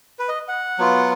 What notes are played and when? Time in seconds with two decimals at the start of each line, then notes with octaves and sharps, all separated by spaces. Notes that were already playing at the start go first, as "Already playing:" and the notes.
0.19 B4
0.28 D#5
0.48 F#5
0.78 F#3 B3 F4